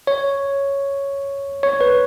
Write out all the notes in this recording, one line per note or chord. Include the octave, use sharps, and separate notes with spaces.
C#5
C#5
B4